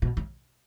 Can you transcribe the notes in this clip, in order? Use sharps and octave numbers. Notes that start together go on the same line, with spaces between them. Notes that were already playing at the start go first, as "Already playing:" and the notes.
B2
C#3